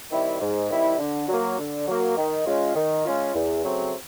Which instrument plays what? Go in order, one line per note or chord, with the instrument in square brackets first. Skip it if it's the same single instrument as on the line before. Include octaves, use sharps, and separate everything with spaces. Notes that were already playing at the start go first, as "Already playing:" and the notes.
[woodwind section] D#3 G3 C4 E4
G#2
D#3 G3 C4 E4
D3
F#3 A#3
D3
F#3 A#3
D#3
G#3 C#4 F4
D#3
G#3 C#4 F4
E2
C#3 F#3 A3 C4